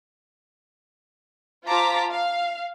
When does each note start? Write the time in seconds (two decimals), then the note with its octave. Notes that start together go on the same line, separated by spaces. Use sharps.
1.66 F4 C5 A5 A#5 D6 B6
2.12 F5